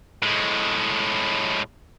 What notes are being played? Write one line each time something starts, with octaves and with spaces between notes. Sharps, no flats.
A2 G#3